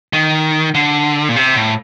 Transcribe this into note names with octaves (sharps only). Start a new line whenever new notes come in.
D#3
D3
A#2
C3
A2